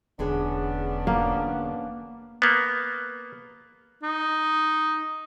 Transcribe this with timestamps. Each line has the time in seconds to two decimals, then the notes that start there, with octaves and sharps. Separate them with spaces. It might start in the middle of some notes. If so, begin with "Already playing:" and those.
0.19 E1 E2 D3 B3 C#4 D4 G#4
1.07 A#3
2.42 A#3 B3
4.03 D#4